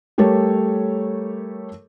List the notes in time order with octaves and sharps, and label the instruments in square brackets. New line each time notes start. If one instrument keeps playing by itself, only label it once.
[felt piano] G3 A3 G4 A4 A#4 C#5